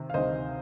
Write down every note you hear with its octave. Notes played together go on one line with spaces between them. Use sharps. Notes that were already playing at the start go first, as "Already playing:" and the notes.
Already playing: C3 D#3
F5
D2 C3 D#3 C5 D#5